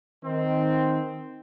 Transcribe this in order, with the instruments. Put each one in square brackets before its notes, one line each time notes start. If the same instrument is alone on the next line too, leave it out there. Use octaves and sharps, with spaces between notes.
[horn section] D#3 C4